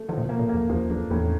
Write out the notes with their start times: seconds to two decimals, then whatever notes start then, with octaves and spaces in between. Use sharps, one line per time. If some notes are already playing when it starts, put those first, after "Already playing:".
Already playing: A3
0.09 D#3 F3
0.18 A#2
0.24 B2
0.29 A#3
0.39 A#2
0.49 F2 A#3
0.69 E2 F3
0.90 F2 D4
1.11 E2 A2